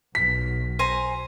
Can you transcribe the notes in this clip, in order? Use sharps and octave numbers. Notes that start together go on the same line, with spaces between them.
B1 B2 B6
C5 G#5 A#5